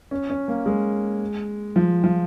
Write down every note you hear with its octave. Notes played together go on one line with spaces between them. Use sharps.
C#4
C#4
A#3
G#3
F3
F3